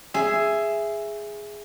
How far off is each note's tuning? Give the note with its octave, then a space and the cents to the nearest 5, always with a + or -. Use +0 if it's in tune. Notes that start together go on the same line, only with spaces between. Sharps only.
G#4 +0 E5 +10